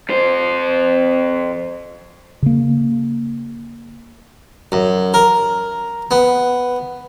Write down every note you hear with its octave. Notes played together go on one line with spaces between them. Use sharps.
F2 C5
C#3 A#3
F#2
A#4
B3